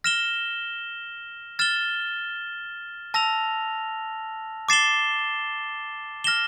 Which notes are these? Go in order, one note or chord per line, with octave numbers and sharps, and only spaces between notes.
F6 A#6 E7 G7
F6 A6 E7 G7
A5 E6 A#6 F7
D6 A6 C7 E7 G7
F6 A#6 E7 G7